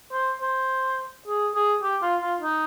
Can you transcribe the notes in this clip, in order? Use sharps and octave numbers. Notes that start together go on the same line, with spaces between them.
C5
C5
G#4
G#4
G4
F4
F4
D#4